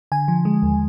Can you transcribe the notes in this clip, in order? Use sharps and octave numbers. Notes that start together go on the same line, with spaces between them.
D3 G#5
F3
G#3
D#2